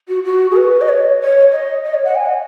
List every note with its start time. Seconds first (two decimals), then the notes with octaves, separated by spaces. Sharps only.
0.08 F#4
0.24 F#4
0.51 G#4
0.56 B4
0.81 D#5
0.89 C#5
1.21 C#5
1.52 D#5
1.84 D#5
1.94 C#5
2.05 F#5
2.16 G#5
2.26 D#5